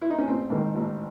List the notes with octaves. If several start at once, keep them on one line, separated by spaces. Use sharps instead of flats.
E4
D#4
C#4
A1 C4
G#2 D#3
A1